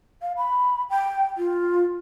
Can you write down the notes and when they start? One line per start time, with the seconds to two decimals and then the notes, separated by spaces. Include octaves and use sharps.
0.22 F5
0.37 B5
0.90 G5
1.38 F4